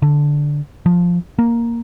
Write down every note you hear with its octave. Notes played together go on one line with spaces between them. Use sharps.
D3
F3
A#3